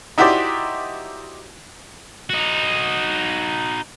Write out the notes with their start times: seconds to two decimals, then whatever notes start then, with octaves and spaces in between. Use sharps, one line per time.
0.18 D#4 E4 F#4 G4 C5 D5
2.30 D#4 F#4